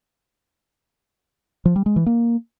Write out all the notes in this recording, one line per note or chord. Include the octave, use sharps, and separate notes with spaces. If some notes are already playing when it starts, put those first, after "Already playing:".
F3
G3
G#3
E3
A#3